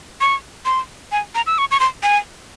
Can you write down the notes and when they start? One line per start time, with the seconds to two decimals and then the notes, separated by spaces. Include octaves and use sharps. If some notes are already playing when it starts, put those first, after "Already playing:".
0.21 C#6
0.65 C6
1.12 G#5
1.35 A#5
1.46 E6
1.58 C#6
1.71 C#6
1.80 C6
2.03 G#5